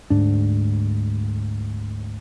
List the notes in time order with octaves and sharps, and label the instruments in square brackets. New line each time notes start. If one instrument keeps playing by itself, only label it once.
[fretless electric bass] D2 G#2 D4